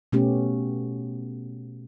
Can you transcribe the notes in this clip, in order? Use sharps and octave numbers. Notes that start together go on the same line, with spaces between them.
B2 A3 B3 C#4 G4